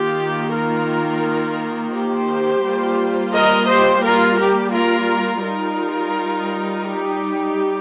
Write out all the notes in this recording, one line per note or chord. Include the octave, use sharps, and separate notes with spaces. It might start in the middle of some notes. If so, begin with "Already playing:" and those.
Already playing: D#3 A#3 F4 G4
F4 A#4
G4 C5
G3 A#3 F4
A#4 D#5
G4 C5
F4 A#4
G4
F4 A#4
G3 D#4 F4 A#4
G4